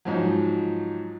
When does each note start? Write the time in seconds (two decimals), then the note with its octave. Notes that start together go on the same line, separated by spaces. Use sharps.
0.05 G#2 F3 F#3